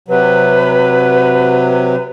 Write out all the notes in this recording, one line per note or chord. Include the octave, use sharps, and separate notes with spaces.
C3 F#3 B4